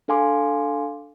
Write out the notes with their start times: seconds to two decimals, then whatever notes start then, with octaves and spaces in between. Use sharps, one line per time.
0.08 D4 A4 F5 G#5 C6 D6